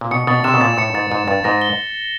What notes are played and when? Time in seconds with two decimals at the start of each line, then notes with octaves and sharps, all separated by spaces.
0.01 A#2
0.11 B2 C#7
0.27 B2 A6
0.44 C3 E7
0.54 B2
0.61 A#2 A6
0.78 A2 C#7
0.94 G#2 A6
1.11 G#2 E7
1.28 G2 A6
1.44 G#2 A#6
1.61 G7